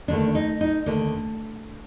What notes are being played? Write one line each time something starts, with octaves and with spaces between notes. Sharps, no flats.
D#2 D3 A3 D4
D#4
D#4
D#2 D3 A3 D4